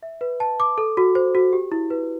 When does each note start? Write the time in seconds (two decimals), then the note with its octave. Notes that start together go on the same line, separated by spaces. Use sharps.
0.03 E5
0.21 B4
0.40 A5
0.60 D6
0.78 A4
0.97 F#4
1.15 C5
1.35 F#4
1.53 G4
1.72 E4
1.90 B4